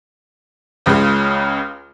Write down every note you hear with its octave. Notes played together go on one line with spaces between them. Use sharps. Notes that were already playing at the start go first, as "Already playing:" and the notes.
C#2 C#3 G#3